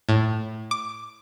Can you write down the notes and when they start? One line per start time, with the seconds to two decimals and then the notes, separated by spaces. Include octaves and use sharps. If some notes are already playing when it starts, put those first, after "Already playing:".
0.09 A2
0.71 D6